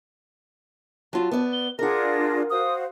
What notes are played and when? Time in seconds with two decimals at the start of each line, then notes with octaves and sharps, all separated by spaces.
1.13 F#3 F4 A5
1.31 B3 D5
1.53 G7
1.79 D4 F4 G#4 A#4 F#5 A#6
2.50 F#4 C5 F5 D#6